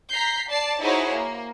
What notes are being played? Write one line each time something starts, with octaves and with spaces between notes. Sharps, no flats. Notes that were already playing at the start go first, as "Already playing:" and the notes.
A#5 G6 B6 C7
D5 A5 C7
D#4 E4 F#4 G#4 C5 C#5
A#3